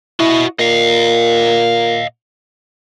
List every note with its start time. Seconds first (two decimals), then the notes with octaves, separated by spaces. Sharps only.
0.20 E4 F#4 D#5
0.59 A#2 D#5 F5